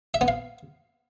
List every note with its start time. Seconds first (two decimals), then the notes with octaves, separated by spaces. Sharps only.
0.14 E5
0.21 B3
0.28 F5